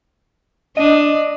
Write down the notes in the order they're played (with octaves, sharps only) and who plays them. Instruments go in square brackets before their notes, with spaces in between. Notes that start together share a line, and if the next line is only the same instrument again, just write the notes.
[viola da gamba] D4 [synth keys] D#5